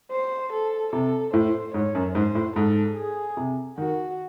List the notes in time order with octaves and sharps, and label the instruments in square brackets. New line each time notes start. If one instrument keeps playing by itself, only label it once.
[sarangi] C5
A4
[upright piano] C3 [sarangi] A4
[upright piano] A2 [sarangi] C5
[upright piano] G#2 [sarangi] C#5
[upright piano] F#2
[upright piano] G#2 [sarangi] C5
[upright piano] A2
[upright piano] G#2 [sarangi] A4
[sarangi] G#4
[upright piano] C3
[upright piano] D#3 [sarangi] F#4